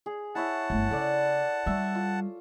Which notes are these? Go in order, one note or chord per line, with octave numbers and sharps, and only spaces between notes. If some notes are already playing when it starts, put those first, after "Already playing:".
G#4
E4 C#5 E5 F#5 A5
G1 A3
C#3 A4 D5
G3 E5 C#6
F4